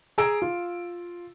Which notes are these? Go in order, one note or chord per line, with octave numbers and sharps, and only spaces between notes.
G#4 G#5 A#5 E6 D7
F4